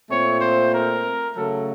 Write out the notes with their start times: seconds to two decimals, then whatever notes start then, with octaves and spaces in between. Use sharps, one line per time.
0.08 A#2 A3 C4 C#5
0.40 C5
0.72 A#4
1.35 C#3 F#3 A3 A4